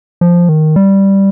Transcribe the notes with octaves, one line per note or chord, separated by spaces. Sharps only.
F3
D#3
G3